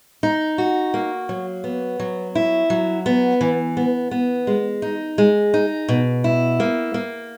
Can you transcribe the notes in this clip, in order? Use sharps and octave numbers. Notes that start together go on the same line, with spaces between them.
D#4
F#4
A#3
F#3
B3
F#3
E4
F#3
B3
E3
B3
B3
G#3
D#4
G#3
D#4
B2
E4
A#3
A#3